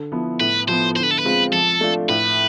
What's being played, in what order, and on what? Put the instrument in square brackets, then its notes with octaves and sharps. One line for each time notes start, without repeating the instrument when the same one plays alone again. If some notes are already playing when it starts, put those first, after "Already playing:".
Already playing: [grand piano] D3
F3 B3 E4
[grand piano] A2 [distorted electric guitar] B4
[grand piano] F3 B3 [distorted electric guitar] C5
[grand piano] D3 [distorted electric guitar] C5
[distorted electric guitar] B4
A4
B4
[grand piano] G#3 C4 F4
[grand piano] F3 [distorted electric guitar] A4
[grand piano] A3 D4 F4
[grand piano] A2 [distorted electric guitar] B4